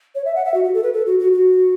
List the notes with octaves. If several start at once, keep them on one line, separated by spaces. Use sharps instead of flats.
C#5
E5
F#5
E5
F#4
F#4
A4
B4
A4
F#4
F#4
F#4